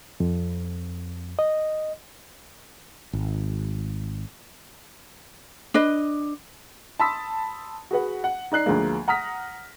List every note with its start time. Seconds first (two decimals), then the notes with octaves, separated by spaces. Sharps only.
0.20 F2
1.39 D#5
3.13 G#1
5.74 D4 B4 D#5
6.99 A5 B5 C6 D#6 E6 B6
7.91 F#4 G#4 B4 F#5
8.24 F#5
8.52 D#4 D5 F#6 C7
8.66 D2 F3 G#3 A#3
9.08 F#5 A#5 D#6 F6 A#6 B6